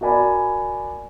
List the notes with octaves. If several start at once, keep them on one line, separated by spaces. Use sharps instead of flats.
F#4 A#4 D5 G#5 B5